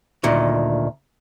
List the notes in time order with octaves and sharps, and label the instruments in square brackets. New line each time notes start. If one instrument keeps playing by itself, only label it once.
[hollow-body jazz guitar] D2 A#2 D#3